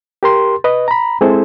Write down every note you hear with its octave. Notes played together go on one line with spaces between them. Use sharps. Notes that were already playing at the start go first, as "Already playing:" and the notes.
G4 A#4 C6
B4 D#5
A#5 B5
G#3 C4 E4 G#4 A4 C5